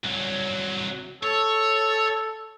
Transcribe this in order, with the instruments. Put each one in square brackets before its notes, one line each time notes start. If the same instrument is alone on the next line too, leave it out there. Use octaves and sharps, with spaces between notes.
[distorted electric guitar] C2 F#3
[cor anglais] A4 [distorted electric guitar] C#5